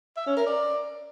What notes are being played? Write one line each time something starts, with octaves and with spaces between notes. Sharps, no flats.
E5
C#4
A#4
D5